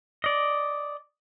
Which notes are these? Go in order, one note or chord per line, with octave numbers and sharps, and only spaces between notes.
D5 D#5